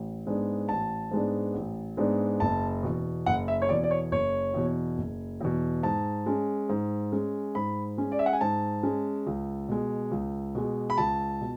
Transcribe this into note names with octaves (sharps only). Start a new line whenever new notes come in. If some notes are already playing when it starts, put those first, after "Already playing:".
Already playing: A1
G#2 G#3 B3 D4
A1 A5
G#2 G#3 B3 D4
A1
G#2 G#3 B3 D4
F#1 A5
E2 B2
F#1 F#5
E5
C#5
E2 B2 D5
D5
C#5
F#1 C#5
E2 B2
F#1
E2 B2
G#2 A5
G#3 C#4
G#2
G#3 C#4
G#2 B5
G#3 C#4
D5
E5
F#5
G#5
G#2 A5
G#3 C#4
C#2
B2 G#3
C#2
B2 G#3
B5
C#2 A5
B2